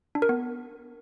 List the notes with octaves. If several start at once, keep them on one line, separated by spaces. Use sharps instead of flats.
D4
A#4
B3